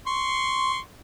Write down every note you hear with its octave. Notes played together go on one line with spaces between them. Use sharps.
C6 C#6